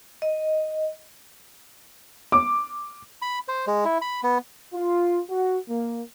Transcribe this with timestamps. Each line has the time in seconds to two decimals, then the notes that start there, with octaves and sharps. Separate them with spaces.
0.22 D#5
2.32 D6
3.22 B5
3.48 C5
3.67 G#3
3.85 E4
4.02 B5
4.23 B3
4.74 F4
5.30 F#4
5.70 A#3